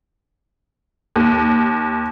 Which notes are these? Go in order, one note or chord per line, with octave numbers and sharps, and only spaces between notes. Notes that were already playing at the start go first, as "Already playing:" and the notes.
D#2